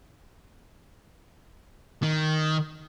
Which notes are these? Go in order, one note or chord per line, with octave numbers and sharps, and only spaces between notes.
D#3